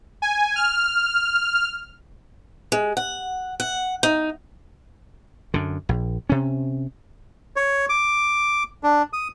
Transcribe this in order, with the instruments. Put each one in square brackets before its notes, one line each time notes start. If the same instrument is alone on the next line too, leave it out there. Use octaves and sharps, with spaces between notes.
[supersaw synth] G#5
F6
[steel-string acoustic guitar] G#3
F#5
F#5
D#4
[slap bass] F#2 D3
A#1
C3 C#4
[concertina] C#5
D6
D4
D#6